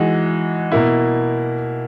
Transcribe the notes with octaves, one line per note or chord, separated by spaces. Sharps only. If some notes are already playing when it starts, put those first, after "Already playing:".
Already playing: E3 G#3 D#4 F#4
B2 A#3 E4